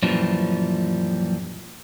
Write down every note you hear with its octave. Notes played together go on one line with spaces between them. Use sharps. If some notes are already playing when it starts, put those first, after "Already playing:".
F#2 A#2 E3 F3 G3